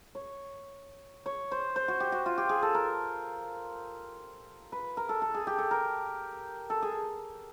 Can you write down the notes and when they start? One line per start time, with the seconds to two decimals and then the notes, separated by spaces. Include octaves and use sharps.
0.15 C#5
1.26 C#5
1.52 C5
1.76 C5
1.88 F#4
2.00 G4
2.12 F#4
2.26 F4
2.38 G4
2.49 G#4
2.62 A4
2.74 A#4
4.72 B4
4.97 A#4
5.09 A4
5.22 A4
5.34 G#4
5.47 G4
5.58 A4
5.71 A#4
6.70 A4
6.82 G#4